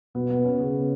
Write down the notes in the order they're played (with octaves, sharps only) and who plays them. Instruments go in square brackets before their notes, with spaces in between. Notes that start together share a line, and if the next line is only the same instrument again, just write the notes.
[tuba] B2 [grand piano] B3
[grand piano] B3
C#4
[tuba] C#3 [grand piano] B3